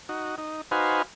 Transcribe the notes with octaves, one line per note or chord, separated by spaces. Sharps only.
D#4 F#4
D#4
D#4 F#4 B4 C5 F5 G#5